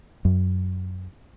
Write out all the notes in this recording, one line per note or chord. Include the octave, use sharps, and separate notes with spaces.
F#2